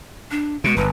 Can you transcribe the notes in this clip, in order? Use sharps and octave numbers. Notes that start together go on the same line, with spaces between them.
D4
B2 G#3
D1 G1 B4